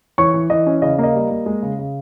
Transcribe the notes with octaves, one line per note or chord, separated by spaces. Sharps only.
E3 C#5 C#6
E3
E3 D#5
C#4
C#3 D#5
A#3 D#5
G3
A#3
G#3
C#3
C#3